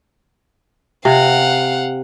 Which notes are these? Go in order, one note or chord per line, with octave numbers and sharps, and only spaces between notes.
C3 F5 F#5